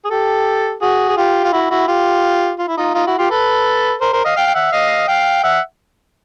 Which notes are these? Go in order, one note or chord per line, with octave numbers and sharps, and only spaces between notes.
G#4
G4 A4
F#4 G#4
G#4
F4 G4
F4
E4 F#4
E4 F#4
F4 G4
F4
E4
D#4 F4
D#4 F4
E4 F#4
F4 G4
A4 B4
A#4 C5
A#4 C5
D#5 F5
F5 G5
G5
E5 F#5
D#5 F5
F5 G5
E5 F#5